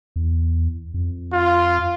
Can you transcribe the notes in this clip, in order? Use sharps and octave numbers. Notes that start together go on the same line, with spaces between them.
E2
F2
F4